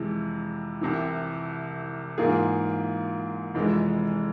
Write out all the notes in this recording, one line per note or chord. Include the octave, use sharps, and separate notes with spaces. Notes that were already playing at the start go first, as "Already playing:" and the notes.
Already playing: F2 C3 E3 G#3
C2 C3 E3
G#2 E3 A#3 F4 G#4
F1 F2 E3 G#3